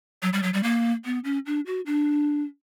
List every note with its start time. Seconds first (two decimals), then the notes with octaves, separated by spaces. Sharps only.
0.22 F#3
0.33 G3
0.43 F#3
0.53 G3
0.63 A#3
1.05 B3
1.24 C#4
1.46 D4
1.66 F#4
1.86 D4